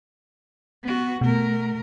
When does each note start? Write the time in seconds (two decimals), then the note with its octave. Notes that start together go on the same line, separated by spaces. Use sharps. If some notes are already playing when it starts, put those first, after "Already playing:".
0.83 B3 F#4
1.21 B2 A3 A#4